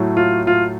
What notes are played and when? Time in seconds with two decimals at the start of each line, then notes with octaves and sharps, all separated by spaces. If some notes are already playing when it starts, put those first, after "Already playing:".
Already playing: A2 F#3 A3
0.17 F4
0.47 F4